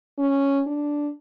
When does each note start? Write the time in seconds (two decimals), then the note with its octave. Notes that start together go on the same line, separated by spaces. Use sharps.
0.19 C#4
0.67 D4